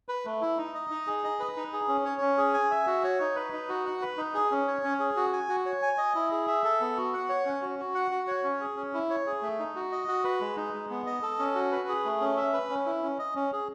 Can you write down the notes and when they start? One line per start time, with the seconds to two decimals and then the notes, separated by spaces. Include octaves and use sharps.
0.09 B4
0.25 A3
0.41 E4
0.58 D#4
0.74 D#5
0.90 D#4
1.07 G#4
1.24 D#5
1.40 B4
1.56 D#4
1.73 G#4
1.88 C#4
2.05 C#5
2.21 C#4
2.38 G#4
2.54 G#5
2.71 E5
2.87 F#4
3.04 C#5
3.20 D#4
3.36 B4
3.53 D#4
3.69 F#4
3.85 F#5
4.02 B4
4.18 D#4
4.34 G#4
4.51 C#4
4.67 C#5
4.84 C#4
4.99 G#4
5.16 F#4
5.33 G#5
5.49 F#4
5.66 C#5
5.82 G#5
5.98 D#5
6.15 E4
6.31 G#4
6.48 E5
6.64 A4
6.81 B3
6.97 F#4
7.13 F#5
7.29 C#5
7.45 C#4
7.62 F#4
7.79 F#4
7.95 F#5
8.11 F#4
8.27 C#5
8.44 C#4
8.60 G#4
8.77 C#4
8.94 E4
9.10 C#5
9.26 G#4
9.42 A3
9.59 D#4
9.75 F#4
9.92 D#5
10.08 F#4
10.24 B4
10.40 G#3
10.57 D#4
10.73 G#3
10.90 B3
11.06 D#5
11.22 A4
11.39 C#4
11.55 F#4
11.72 B4
11.88 G#4
12.05 A3
12.21 C#4
12.37 E5
12.53 B4
12.70 C#4
12.86 E4
13.03 C#4
13.19 D#5
13.35 C#4
13.52 G#4